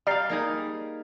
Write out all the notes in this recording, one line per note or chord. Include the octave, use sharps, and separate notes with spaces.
G3 D5 F5 A#5 F6 C7
A#3 D#4 G#4